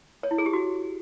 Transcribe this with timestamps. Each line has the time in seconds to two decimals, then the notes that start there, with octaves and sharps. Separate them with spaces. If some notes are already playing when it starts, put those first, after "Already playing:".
0.23 C#5
0.31 E4
0.38 G#4
0.46 G4
0.53 F#4